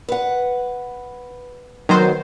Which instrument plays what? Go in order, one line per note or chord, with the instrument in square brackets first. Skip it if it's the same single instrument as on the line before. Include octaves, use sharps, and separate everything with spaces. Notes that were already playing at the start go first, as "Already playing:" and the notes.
[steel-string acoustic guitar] B4 F#5
[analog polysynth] D#3 F#3 C5 [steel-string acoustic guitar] B3